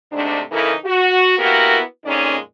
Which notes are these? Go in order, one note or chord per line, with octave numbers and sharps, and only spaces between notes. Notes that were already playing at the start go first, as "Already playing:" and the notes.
G#2 C3 A3 D4
C#3 E3 D#4 E4 A4 A#4
F#4
A#3 B3 E4 F#4 G4 A#4
F2 A#2 G#3 C#4 D#4 D5